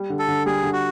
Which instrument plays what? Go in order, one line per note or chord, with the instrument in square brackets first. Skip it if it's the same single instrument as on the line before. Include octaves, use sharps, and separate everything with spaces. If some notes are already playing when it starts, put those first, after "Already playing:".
Already playing: [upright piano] G3
D3
[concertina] A4
[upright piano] D3
[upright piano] G3 [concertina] G#4
[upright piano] D3
[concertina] F#4